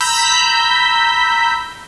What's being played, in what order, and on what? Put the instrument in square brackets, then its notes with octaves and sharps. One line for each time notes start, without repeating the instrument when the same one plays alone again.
[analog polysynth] A#5 B5 E6 G6 B6